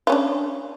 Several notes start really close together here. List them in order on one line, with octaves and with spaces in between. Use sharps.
F4 C#4 D4